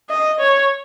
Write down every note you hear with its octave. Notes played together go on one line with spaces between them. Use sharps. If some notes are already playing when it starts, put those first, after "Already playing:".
D#5
C#5